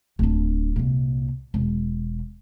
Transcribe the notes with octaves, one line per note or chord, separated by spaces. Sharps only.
D1 D4
C2 A#2
E1